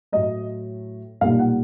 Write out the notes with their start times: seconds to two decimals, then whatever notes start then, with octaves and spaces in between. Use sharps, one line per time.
0.12 A2 F#3 A3 D#5
1.21 B1 A#2 G3 A#3 D#4 F5
1.39 F#5